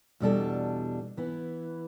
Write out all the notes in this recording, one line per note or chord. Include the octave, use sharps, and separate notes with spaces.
E2 B2 G3 D4 A4
E3 B3 E4